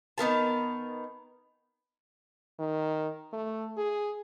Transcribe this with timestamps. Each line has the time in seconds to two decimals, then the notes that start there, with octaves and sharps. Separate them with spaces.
0.18 D#3 B3 A#4 A5
2.60 D#3
3.33 A3
3.77 G#4